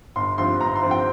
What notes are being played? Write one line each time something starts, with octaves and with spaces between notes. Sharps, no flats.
G1 C6
G2 F3 C4 C6
G1 A#5
C6
G2 F3 C4
G5